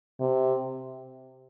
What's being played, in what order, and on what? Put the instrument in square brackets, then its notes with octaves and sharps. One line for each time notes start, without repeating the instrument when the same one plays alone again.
[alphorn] C3